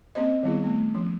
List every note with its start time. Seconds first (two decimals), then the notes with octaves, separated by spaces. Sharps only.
0.15 A#3 C4 C#4 C5 D#5
0.43 D#3 G3 B3 E4 G#4
0.64 A3 B3
0.94 F3 C#4